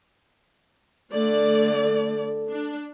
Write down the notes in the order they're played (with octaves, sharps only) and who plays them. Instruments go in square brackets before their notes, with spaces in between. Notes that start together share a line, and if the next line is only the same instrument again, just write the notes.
[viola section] D3 A3 D5 [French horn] A4
[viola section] D4